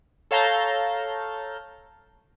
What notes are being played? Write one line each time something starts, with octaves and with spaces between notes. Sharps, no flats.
A4 C#5 F5 A5 A#5 G6